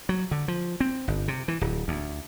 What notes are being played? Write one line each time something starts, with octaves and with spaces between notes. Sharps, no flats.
F#3
D3
F3
C4
G1
C3
E3
D1
D2